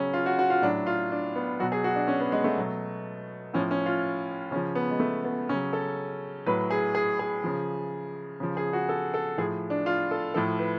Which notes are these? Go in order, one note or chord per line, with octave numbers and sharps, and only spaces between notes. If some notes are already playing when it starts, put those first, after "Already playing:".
Already playing: C#3 F#3 C#4
F4
F#4
F#4
F4
A2 F#3 D4
F4
D4
B3
B2 F#3 F#4
G#4
F#4
D4
C#4
B3
G#3
A3
B2 F#3
A2 F3 C#4
C#4
F4
C#3 F3 C#4
B3
G#3
A3
B3
C#3 F#3 C#4
A4
A2 F#3 B4
G#4
G#4
G#4
C#3 F3
C#3 F3
G#4
F#4
A4
A4
A2 F3 G#4
D4
F4
A4
A2 F3 A4
B4